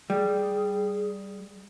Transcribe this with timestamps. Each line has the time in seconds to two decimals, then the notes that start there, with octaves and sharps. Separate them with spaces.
0.10 G3 G#4